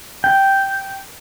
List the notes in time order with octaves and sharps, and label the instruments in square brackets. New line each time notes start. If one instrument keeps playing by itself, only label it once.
[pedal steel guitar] G5